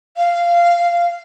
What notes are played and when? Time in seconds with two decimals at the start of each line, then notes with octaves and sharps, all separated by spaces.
0.17 F5